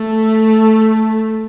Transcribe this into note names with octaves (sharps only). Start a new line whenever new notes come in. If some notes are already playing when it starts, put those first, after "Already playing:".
Already playing: A3